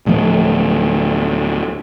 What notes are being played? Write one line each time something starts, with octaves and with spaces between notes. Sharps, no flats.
D1 D2 F3 A3